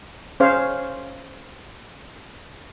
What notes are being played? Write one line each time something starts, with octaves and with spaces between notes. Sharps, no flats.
C#4 G#4 C5 C#5 F5